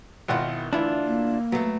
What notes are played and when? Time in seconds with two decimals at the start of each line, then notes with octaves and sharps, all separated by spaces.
0.28 G#1 B2 D#3 E4 F4 F#5
0.73 D2 E3 D4 E4 F4 E5
1.06 A#3
1.52 F#3 A3 B3